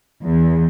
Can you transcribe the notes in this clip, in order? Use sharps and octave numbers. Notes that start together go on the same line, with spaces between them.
E2